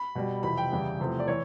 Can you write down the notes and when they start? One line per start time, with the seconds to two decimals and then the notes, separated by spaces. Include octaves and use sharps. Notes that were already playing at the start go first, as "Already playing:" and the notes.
Already playing: B5
0.15 B2 G3
0.43 F2 C3 E3 B5
0.57 G5
0.71 E2 C#3 E3 G3
0.99 E2 C3 F3 A3
1.20 D5
1.28 E3 C#5